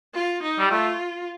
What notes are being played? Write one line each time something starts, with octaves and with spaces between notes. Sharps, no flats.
F4
D#4
G3
A3 F4